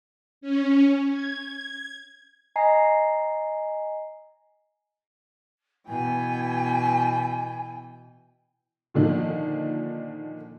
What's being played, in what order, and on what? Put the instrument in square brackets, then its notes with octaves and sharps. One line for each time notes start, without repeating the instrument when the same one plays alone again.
[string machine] C#4
G#6
[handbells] D#5 G#5 A#5 C7
[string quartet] B2 E3 G5 [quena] G#5
[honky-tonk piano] A#2 D3 D#3 F3